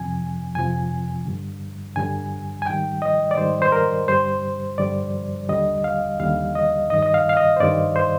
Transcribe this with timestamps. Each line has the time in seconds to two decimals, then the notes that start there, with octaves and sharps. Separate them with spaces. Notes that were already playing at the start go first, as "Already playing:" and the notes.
Already playing: F2 C3 F3 G#5
0.55 F2 C3 F3 G#5
1.25 G2 D3 G3
1.96 G2 D3 G3 G#5
2.62 G#5
2.67 G#2 D#3 G3 G5
3.02 D#5
3.31 D5
3.37 G#2 D#3 G3 C5
3.62 C5
3.72 A#4
4.08 G2 D3 G3 C5
4.78 G2 D3 G3 D5
5.49 D#2 D3 G3 D#5
5.84 F5
6.20 D#2 D3 G3 F5
6.55 D#5
6.90 G2 D#3 G3 D#5
7.02 D#5
7.14 F5
7.29 F5
7.37 D#5
7.57 C5
7.60 G2 D#3 G3 D5
7.96 C5